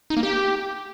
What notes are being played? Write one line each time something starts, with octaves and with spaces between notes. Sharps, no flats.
D#4
A#3
G4